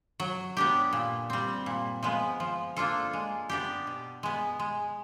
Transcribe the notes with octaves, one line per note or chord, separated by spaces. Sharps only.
F#3
B3 D4 G4
A#2
G3 C4
A#2
F3 G#3 B3
F3
A#3 D4 F4 A4
G#3
B3 D4 G4
B2
G#3 B3
G#3